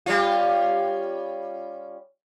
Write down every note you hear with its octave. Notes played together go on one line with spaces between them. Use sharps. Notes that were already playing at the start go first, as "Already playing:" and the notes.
G3 C#4 F4